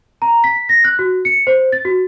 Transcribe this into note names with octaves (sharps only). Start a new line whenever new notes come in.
A#5
B6
A#6
F#6
F#4
C#7
C5
A6
F#4